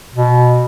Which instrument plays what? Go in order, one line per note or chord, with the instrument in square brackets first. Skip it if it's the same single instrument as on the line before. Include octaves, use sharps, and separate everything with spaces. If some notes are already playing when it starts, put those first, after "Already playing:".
[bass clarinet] B2